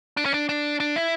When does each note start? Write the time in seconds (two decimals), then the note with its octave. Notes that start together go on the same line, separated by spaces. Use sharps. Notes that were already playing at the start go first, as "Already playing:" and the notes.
0.17 D4
0.25 C#4
0.34 D4
0.49 D4
0.80 D4
0.96 E4